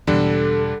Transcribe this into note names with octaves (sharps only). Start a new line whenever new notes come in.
E1 E2 D3 G3 D4 A4